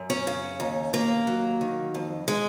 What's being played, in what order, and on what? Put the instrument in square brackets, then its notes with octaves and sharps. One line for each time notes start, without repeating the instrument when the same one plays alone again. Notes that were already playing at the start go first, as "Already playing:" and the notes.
Already playing: [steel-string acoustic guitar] F#2
C#4
C#3
D#2
D#2 A#3
F#3
D#3
F2
G#3